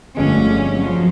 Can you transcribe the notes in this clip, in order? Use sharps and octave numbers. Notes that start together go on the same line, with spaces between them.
G1 F2 D3 G#3 A3 C#4
F3 F#3